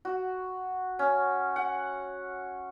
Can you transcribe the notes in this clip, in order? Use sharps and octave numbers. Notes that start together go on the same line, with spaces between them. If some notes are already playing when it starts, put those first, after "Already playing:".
F#4
C#4
F#5